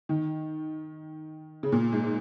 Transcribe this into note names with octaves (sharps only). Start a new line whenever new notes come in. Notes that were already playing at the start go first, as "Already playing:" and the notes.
D#3
C#3
A#2
G#2